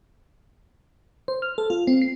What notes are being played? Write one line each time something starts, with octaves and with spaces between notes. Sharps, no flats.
C5
F6
A4
F4
C4
C7